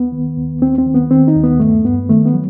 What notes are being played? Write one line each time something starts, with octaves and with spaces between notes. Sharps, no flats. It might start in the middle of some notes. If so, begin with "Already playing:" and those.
Already playing: D#2 B3
D#3
D#2
D#2 C4
C4
D#3
B3
D#3 C4
D#4
D#2
B3
G2 A3
G2 B3
D#3 A3
B3
F#3